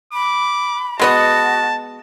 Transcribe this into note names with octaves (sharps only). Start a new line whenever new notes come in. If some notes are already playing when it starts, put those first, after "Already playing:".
B5 D6
G#3 B3 F#4 D#5 A5